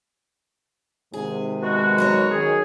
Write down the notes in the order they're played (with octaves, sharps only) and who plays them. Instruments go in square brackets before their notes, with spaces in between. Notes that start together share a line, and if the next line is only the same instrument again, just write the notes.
[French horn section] G#2 C3 D#3 [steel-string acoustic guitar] G#4
[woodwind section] B2 G#3 F#4
[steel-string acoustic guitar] F#3 A#4 C#5
[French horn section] D#3 C#4 [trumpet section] G#4